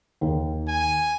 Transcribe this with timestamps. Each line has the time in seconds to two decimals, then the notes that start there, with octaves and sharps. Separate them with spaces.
0.21 D#2
0.68 G#5